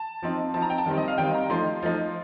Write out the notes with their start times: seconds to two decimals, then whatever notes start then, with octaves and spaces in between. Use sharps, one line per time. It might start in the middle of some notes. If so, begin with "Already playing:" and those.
Already playing: A5
0.22 F3 C4 D#4
0.54 F3 C4 D#4 A5
0.62 A#5
0.70 G5
0.78 A5
0.86 D#3 G3 C4 D#4
0.97 D#5
1.08 F5
1.18 D#3 G3 C4 D#4 G5
1.34 A#5
1.50 F3 A3 D#4 C6
1.82 F3 A3 D#4